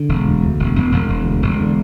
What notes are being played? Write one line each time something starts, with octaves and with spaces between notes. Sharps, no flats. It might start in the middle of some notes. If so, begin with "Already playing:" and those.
Already playing: D3
E1
D2
D2
E1
E1
E1
E1
D2
E1
D3